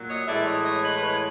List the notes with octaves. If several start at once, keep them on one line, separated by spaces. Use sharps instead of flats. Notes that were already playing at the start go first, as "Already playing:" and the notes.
Already playing: A#2 F#3
C#5 D#5
A2 E3 G#3 D5 E5
C#5 D#5
C#5 D#5
B4 C#5
B4 C#5